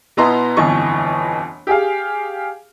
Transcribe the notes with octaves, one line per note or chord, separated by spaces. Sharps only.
B2 B3 E4 D#5 A#5 C6
G1 F2 B2 E3 D#5 C#6
G4 G#4 F5